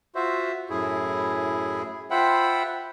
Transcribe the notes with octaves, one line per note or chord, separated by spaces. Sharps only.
F4 F#4 C5 E5
F#2 A2 E4 G#4
F4 C5 E5 F#5 G5 B5